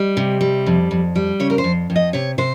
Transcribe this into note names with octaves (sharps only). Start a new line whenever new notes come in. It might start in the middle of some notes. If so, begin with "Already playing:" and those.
Already playing: G3 D#5
C3
G3
F2
F2
G3
C#3 C#5
A#4
C5
F2
F2
D#5
C3 C#5
C3 C5